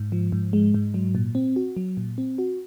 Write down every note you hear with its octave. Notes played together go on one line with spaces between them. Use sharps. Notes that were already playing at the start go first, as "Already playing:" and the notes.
Already playing: G#2
F3
G#2
G#3
G#2
F#3
A#2
C4
F#4
F#3
A#2
C4
F#4